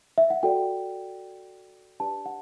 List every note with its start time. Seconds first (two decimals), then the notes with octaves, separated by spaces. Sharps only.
0.18 E5
0.30 F#5
0.43 F#4 A4 D5 G5
2.00 D4 G4 B4 D5 A5
2.26 F#5